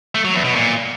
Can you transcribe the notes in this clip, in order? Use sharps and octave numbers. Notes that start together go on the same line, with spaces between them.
A3
F#3
E2
B2
A#2